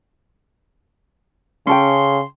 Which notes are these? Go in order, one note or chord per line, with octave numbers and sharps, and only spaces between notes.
C#3 C#4 A4 G5 C6